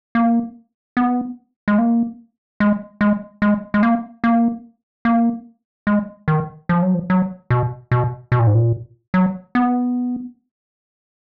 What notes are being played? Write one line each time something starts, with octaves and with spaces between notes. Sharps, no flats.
A#3
B3
G#3
A#3
G#3
G#3
G#3
G#3
A#3
A#3
A#3
G#3
D#3
F3
F#3
F3
F#3
B2
B2
B2
A#2
G#2
A#2
F#3
B3